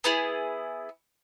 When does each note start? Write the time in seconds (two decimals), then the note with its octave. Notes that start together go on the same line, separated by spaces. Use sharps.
0.04 B3 E4 G#4